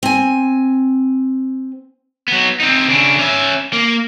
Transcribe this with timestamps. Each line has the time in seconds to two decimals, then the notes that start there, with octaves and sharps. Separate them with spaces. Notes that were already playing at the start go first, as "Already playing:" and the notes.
0.03 C4 G#5
2.28 F#3 B3
2.60 C4 D#4
2.89 C#3 D4
3.19 C#4 E5
3.73 A#3